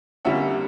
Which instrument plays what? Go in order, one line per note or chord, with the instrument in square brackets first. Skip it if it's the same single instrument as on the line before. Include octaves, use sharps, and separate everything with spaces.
[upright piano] F2 D3 G3 A#3 C#4 E5 F#5